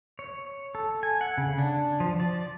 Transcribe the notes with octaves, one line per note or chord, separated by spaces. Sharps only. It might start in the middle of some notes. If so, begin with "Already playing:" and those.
C#5
A4
G#5
F#5
C#3
D4
F3
D5